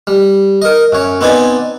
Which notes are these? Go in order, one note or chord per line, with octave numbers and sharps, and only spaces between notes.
G3
A#4 D#5
F#2 C#5
B3 C4 D#4 D5 G#5